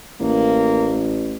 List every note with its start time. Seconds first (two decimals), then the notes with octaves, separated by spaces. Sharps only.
0.20 A1 A#3